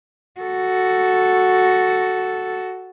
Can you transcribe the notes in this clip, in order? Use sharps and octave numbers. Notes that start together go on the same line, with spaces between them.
F#4 A4